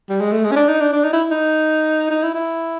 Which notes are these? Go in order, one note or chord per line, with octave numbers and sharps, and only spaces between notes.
G3
G#3
A3
G#3
C#4
D4
D#4
D4
D4
D#4
E4
D#4
D#4
E4
E4